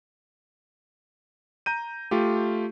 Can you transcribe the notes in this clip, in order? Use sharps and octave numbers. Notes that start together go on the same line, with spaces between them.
A#5 G6 D#7
A3 F4 G4